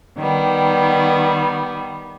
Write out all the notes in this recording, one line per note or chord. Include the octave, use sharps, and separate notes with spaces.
D#3 G3 B3